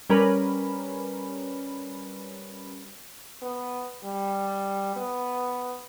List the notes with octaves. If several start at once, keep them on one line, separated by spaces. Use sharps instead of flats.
G3 C#4 A#4 B4
B3
G3
B3